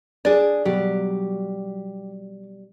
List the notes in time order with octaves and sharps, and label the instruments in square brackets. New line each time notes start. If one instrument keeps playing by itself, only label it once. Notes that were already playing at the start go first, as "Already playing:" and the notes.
[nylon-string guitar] D4 G#4 [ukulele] D5
[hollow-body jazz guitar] B2 F#3 G3 [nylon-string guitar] G4